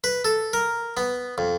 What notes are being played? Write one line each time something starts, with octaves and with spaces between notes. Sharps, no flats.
B4
A4
A#4
B3
F2